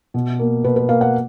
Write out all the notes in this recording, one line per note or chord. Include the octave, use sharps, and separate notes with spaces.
B2
A#3
B2 B4
B4
A#3 F5
F#5